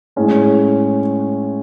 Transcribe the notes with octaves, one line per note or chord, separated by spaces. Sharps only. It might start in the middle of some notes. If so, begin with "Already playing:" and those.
A2 G#3 C#4